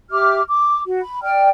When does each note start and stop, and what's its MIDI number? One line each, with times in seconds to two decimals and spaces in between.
0.11 0.42 67
0.11 0.42 76
0.11 0.42 86
0.11 0.42 89
0.48 0.82 86
0.87 1.01 66
1.01 1.22 83
1.22 1.49 74
1.22 1.49 79
1.22 1.49 89